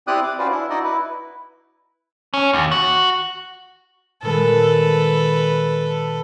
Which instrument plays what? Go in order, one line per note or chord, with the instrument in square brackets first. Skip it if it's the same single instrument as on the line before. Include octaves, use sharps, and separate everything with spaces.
[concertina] C4 E4 G4 D5 D#6 F#6
D6
C#4 F4 F#4 B4 C5 D5
D4 E4
D#4 E4 F#4 D5 D#5
E4 B4
[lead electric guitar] C#4
D#2
F#4
[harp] A#2 D#3 G#3 [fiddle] A4 B4